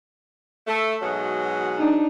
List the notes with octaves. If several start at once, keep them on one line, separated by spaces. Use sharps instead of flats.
A3
G#2 B2 F#3
D4 D#4